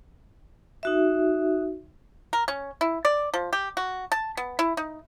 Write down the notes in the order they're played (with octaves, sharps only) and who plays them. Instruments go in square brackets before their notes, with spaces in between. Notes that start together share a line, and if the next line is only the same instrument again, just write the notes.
[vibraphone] D#4 F#4 E5
[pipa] A#4
C#4
E4
D5
F3
G4
F#4
A5
B3
E4
D#4